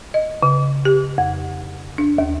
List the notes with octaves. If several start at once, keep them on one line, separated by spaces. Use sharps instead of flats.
D#5
C#3
G4
F2
D4
D#2